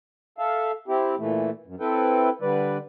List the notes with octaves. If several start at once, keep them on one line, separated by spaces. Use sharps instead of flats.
A4 E5 F5
C4 E4 G4
A#2 E3 A3
F#2
C4 E4 A4 B4 G5
D3 G3 B4 D5